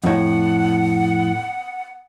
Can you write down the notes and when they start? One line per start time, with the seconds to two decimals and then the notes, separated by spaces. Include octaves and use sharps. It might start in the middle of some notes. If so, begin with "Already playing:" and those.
0.04 F2 A2 F#5